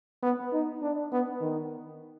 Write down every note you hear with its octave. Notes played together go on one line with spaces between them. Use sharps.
B3
D#4
D4
B3
D#3